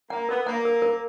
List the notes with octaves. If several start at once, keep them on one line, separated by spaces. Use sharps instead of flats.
A#3 F#5
B3 A#4
A#3 F#5
A#4
A#4